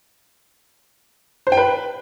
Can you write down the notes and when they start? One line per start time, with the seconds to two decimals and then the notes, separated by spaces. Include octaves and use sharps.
1.47 C5
1.52 G5
1.57 B4